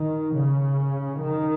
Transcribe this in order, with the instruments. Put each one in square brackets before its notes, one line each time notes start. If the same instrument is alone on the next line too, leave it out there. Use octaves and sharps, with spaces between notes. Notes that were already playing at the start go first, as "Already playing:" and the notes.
Already playing: [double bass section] D#3
C#3
D#3